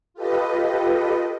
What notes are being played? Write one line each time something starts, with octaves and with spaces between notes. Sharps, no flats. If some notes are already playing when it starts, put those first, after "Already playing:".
F4 G4 A4 B4 D#5